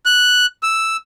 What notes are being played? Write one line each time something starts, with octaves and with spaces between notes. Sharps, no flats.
F#6
E6